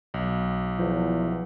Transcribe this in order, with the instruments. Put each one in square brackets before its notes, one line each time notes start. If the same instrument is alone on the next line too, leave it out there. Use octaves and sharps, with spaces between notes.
[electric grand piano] B1
[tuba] E2 [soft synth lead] F3